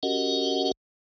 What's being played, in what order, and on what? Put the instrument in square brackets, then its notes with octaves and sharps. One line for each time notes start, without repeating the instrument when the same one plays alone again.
[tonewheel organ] C#4 F#4 G4 A#4 D#5 F#5